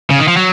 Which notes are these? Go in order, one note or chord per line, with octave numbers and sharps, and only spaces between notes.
C#3
D#3
F3
F#3